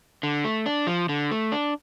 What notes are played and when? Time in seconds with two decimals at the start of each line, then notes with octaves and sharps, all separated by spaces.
0.23 D3
0.44 A3
0.66 D4
0.87 F3
1.09 D3
1.31 A3
1.52 D4